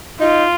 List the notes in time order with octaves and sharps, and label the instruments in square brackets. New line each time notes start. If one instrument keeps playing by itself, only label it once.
[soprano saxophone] D#4 [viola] F4